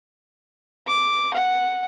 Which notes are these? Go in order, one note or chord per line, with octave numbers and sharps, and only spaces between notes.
D6
F#5